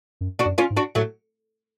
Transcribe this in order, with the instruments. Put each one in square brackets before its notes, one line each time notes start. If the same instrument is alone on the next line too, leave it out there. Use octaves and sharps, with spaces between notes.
[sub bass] F#2
[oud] D4 F#4
[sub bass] F#2
[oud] C#4 F4
[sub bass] G#2
[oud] D4 F#4
[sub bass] A2 [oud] F#3 A3